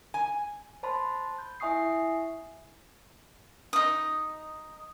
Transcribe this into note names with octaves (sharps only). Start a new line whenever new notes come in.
G#5
C5 A5 B5 C6
G6
E4 E5 G#5 C#6 D#6 C7
D#4 D#6